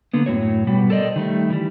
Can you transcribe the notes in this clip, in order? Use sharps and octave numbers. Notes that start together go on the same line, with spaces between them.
D3 A#3 B3
F#2 A2 F#3 C#5
B2 G3 B3
A4 A#4 C5 D5 D#5
D#3 G3 A3
E3 G3